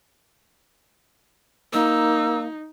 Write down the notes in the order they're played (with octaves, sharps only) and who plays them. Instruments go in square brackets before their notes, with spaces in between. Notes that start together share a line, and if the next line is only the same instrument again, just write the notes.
[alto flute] A#3 [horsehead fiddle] D#4 [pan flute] E6